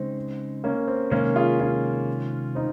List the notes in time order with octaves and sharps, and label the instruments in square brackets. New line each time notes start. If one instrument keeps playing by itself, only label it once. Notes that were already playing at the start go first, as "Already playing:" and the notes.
Already playing: [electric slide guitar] C#3 G#3 D#4 [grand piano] C4
[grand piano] A#3 C#4
C4
[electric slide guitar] C3 D#3 G#3 [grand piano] A#3 C#4
[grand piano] F4 G#4
C#4 F4
C4 D#4